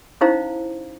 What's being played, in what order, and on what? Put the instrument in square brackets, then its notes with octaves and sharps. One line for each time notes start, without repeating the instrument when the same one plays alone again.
[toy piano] C#4 D#4 E4 C5 F5 A#5